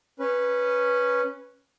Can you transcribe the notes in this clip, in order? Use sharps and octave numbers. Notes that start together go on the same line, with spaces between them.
C#4 B4